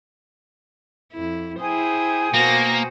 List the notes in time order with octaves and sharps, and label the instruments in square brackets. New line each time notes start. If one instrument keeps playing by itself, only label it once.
[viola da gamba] F2 E4
[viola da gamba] E4 G#4 C5 [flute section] G5 G#5 D#6
[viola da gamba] B2 F#4 C5 [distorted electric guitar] A#3 [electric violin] A#6